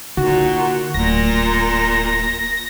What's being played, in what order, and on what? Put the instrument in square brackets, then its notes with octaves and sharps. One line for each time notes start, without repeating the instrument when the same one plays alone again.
[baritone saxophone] A#2 [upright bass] D3 D#4 [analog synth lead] F#4
[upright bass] D1 [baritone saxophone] A#2 [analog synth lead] A#6